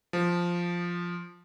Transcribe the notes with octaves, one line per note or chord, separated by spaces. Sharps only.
F3